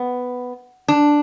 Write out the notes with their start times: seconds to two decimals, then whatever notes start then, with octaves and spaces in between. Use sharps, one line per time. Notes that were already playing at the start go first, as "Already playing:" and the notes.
Already playing: B3
0.88 D4